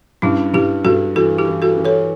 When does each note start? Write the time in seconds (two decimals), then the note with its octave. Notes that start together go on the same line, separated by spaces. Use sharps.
0.22 G2 C#4 E4
0.54 G2 E4 G4
0.84 G2 F#4 A4
1.16 E3 F#4 A4
1.38 E4 G4
1.47 E3
1.62 F#4 A4
1.77 E3
1.85 A4 C#5